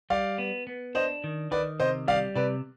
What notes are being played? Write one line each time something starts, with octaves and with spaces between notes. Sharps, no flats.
G3 D5 F5
B3
B3
D4 C5 D#5
D#3
D#3 B4 D5
C3 C5 D#5
G3 D5 F5
C3 B4 D5